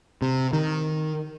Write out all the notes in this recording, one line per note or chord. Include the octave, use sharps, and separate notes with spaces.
C3
D#3